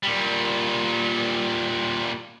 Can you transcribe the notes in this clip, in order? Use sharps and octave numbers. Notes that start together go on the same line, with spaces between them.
A#2 G3